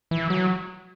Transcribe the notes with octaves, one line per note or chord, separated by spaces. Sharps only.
E3
F#3